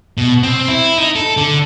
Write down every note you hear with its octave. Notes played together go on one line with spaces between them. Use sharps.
B2
C4
E4
D#4
A4
D3